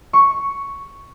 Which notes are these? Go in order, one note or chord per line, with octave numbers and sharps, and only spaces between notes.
C#6